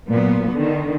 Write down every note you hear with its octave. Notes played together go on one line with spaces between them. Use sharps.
A#2 F#3 B3
D3 D#3